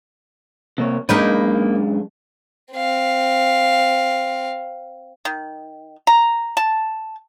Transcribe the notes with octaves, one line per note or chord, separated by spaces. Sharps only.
C3 A#3 C#5
F#2 G#3 A#3 D4 D#4 B4
C4 F5
D#3
A#5
A5